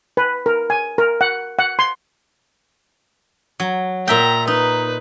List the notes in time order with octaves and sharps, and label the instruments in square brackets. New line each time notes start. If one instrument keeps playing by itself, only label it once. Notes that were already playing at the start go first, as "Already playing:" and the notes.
[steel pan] B4
A#4
G#5
A#4
F#5
F#5
C6
[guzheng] F#3
[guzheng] A#2 E5 G5 [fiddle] A#5
[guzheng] D#4 [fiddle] B4